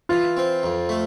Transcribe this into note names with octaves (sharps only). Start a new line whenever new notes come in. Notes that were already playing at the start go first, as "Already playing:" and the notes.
E3 F4
C4
F2
A3